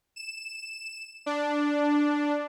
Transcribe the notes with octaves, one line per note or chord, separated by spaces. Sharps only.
E7
D4